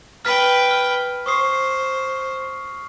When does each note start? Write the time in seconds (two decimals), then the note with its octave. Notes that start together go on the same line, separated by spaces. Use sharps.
0.25 B4 G5 F6 B6
0.71 F6
1.26 C5 C#6 D#6 C7